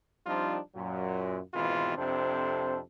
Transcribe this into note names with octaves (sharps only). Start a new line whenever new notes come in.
F3 G3 C4 D4 D#4 F4
F#2 A#2 F#3
G#1 B2 E3 G#3 C4 F4
F2 C3 D4 A4 C5